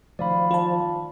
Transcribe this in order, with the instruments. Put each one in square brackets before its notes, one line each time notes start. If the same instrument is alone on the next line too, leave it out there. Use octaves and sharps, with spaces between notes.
[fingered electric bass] D#3 A3 [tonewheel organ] F3 [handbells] D5 F5 B5
[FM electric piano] F4 A5